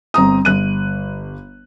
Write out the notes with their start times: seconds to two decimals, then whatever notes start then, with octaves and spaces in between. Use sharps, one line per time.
0.14 G1 C4 A#5 D#6
0.45 G1 F#6 D#7